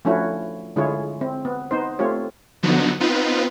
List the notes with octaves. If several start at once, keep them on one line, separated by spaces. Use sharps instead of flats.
F3 A3 C#4 D4 E4 F#4
D3 G#3 E4 F4 G#4 C#5
C4
B3
B3 D#4 C5
A3 C4 F4 G4 C#5
D3 F3 F#3 B3 D#4 F#4
B3 C4 D#4 F4 B4